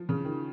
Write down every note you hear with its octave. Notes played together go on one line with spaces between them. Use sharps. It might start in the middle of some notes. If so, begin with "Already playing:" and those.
Already playing: F3
C#3
D#3